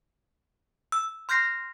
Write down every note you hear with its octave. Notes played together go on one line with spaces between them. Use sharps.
E6
C6 F6 G6 A#6 C7